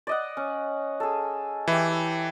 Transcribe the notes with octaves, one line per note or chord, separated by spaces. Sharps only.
D5 D#5 F#5
C#4
G#4 A4
E3 E4 G4